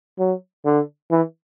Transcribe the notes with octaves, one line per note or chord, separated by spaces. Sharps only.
F#3
D3
E3